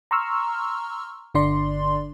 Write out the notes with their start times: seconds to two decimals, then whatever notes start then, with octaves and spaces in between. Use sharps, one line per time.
0.11 A#5 C6 C#6 E6 F6
1.34 G1 D3 D4 D5 C6